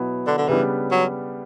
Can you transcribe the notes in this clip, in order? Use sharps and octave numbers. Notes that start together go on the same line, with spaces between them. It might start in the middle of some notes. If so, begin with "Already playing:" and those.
Already playing: B2 F#3 B3 E4
D3
D3
C#3 E3 G3 B3 D4
F#3